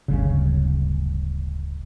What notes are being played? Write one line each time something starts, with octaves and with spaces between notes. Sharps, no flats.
D1 G1 C#3